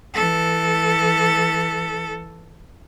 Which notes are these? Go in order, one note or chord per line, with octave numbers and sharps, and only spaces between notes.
E3 A4